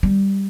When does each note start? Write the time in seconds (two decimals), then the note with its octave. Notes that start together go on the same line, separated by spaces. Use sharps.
0.03 G3